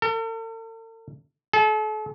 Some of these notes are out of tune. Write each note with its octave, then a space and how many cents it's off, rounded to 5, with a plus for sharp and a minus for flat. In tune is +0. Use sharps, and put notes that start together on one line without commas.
A4 +45
A4 -40